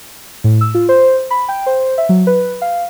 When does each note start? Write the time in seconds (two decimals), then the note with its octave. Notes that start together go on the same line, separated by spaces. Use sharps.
0.44 A2
0.61 E6
0.74 F4
0.89 C5
1.30 B5
1.49 G5
1.66 C5
1.98 E5
2.09 F#3
2.27 B4
2.62 F5